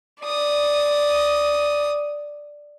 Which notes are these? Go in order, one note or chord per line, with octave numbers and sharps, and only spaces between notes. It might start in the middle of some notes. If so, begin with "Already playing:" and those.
D5 D#6